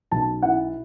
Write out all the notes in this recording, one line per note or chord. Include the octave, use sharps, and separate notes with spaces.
B1 A5
E4 F#5